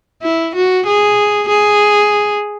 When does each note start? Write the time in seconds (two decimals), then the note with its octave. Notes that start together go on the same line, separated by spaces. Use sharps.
0.22 E4
0.55 F#4
0.87 G#4
1.48 G#4